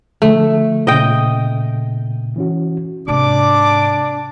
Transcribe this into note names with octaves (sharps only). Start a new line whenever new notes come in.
D3 F3 A3
A#2 C#3 D#5 G5
E3 C#4 F#4
G#2 C3 D4 D6